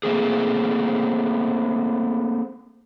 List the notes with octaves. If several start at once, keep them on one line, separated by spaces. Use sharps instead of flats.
A3 A#3 C4 G#4